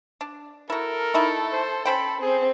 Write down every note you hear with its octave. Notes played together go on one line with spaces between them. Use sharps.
D4
E4 F#4 A4 A#4
A3 D#4 E4
C5
C#4 C5 G5 B5
C4 G#4